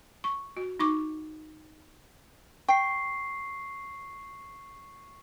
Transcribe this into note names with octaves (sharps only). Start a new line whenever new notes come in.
C#6
F#4
D#4 C#6 D6
G5 C#6 C7